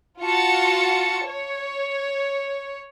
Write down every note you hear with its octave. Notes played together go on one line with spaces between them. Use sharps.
F4 F#4 A5 C#7
C#5